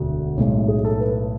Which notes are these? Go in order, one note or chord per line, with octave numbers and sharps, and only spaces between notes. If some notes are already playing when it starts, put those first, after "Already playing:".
Already playing: E1 D2 D3 F#4
B1 A2 G#3
G#4
A4
B4